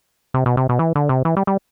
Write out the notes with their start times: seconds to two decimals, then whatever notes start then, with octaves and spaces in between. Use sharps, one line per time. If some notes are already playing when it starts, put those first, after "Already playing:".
0.34 C3
0.46 B2
0.57 C3
0.69 B2
0.79 E3
0.95 D3
1.09 C3
1.25 E3
1.37 G3
1.47 G3